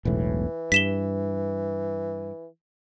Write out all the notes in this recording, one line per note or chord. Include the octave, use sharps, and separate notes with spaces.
E1 B1 A2 E3
G2 B6 E7 G7